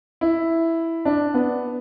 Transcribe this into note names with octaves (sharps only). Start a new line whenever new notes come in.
E4
D4
B3